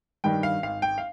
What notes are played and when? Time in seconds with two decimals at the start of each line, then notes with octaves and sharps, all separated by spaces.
0.24 G2 D#3 G3 G5
0.43 F5
0.63 G#1 F5
0.82 G5
0.98 F5